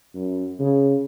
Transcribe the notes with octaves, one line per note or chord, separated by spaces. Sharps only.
F#2
C#3